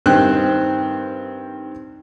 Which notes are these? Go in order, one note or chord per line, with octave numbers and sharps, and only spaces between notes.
G2 D#3 C4 C5 F#6